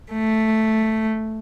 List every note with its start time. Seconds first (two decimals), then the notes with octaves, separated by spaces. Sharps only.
0.12 A3